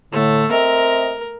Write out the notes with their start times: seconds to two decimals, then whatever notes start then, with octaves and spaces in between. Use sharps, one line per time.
0.12 A2 D3 A3
0.52 C4 A#4 D#5 E5